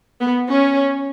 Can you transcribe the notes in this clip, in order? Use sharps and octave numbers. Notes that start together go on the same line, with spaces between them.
B3
C#4